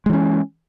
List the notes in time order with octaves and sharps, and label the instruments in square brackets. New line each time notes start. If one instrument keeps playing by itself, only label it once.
[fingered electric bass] G#3
E3
C#4